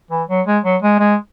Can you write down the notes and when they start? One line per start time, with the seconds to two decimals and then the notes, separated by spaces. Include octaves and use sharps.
0.11 E3
0.29 F#3
0.47 G#3
0.64 F#3
0.82 G#3
0.99 G#3